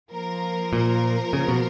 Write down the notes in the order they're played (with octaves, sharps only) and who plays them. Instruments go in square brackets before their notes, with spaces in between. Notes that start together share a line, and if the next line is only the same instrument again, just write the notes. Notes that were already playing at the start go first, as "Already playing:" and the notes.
[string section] F3 A#3 F4 A#4
[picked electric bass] A#2
C#3
B2